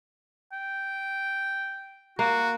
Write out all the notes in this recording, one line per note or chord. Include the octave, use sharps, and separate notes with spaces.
G5
A#3 F#4